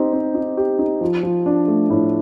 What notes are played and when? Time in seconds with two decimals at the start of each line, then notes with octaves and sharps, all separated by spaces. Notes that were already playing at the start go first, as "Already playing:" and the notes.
Already playing: C4 D#4 G4
0.13 C4
0.35 D#4
0.57 G4
0.79 D#4
1.01 F3
1.23 F3
1.46 D4
1.68 A3
1.90 A2